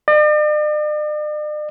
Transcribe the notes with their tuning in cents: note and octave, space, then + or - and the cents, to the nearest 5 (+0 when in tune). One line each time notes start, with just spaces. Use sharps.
D5 +45